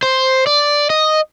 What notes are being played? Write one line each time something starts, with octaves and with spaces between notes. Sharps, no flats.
C5
D5
D#5